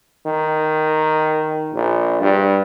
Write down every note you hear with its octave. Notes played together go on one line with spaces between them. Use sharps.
D#3
A#1
G2